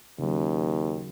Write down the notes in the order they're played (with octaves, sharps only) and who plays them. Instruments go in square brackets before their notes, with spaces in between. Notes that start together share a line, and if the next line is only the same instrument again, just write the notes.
[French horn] D#2 [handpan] C#3 F#3